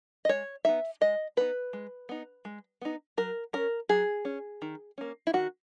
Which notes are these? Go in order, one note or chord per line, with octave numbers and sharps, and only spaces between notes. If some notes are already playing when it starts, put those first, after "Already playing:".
D#5
G#3 C#5
B3 D#4 E5
G#3 D#5
B3 D#4 B4
G#3
B3 D#4
G#3
B3 D#4
F#3 A#4
C#4 A#4
F#3 G#4
C#4
D#3
A#3 C#4
E4
D#3 F#4